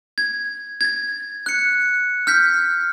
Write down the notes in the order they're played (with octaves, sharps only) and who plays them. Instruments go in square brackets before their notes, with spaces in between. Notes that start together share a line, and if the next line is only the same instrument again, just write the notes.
[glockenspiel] G#6
G#6 A6
F#6 C#7
F6 G6 B6